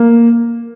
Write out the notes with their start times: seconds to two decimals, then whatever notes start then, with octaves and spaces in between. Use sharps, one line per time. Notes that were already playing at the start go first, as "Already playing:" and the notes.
Already playing: A#3